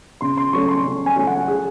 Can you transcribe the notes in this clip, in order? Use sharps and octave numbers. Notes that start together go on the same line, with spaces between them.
C#3 C6
C6
F#3 A3 C#4 C#6
C6
C#3
G#5
F#3 A3 C#4
F#5
G#4